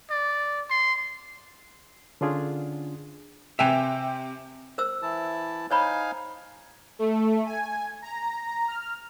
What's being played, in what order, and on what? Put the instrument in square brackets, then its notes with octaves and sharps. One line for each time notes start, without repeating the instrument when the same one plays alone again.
[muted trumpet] D5
C6
[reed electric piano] D3 C#4 D4 F4 G#4
[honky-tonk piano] C3 G5 F7 [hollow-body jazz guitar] E5 G#5
[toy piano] A#4 C5 E6
[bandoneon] E3 E4 A5
[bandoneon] D#4 F5 G#5 [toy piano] C5 C#5 B5
[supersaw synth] A3
G#5
A#5
F6